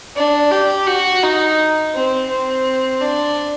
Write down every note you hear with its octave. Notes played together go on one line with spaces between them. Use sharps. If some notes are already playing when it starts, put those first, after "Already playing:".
D4
G4
F#4
D#4
C4
C4
D4